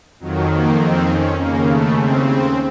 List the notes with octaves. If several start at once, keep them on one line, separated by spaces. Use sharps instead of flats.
F2 D#3 F#3
A#3
C4
C#4
D#2 C#3 A#3
A3
C4
C4